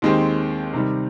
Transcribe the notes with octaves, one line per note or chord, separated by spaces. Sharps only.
D#2 D#3 G#3 C4 G4
C3 D#3 G3